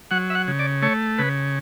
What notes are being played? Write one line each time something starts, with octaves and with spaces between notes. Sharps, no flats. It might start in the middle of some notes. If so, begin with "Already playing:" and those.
F#3 F#5
E5
F#5
C#3
D5
A3 C#5
C#3 B4